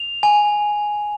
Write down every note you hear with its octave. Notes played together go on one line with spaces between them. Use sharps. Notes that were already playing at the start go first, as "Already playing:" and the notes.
Already playing: F7
G#5